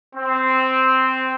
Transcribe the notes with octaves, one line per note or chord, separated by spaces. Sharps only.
C4